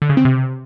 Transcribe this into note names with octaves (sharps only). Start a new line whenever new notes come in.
D3
C#3
C4
C3